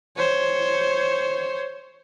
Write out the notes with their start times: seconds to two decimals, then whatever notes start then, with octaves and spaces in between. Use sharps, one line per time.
0.17 C5 C#5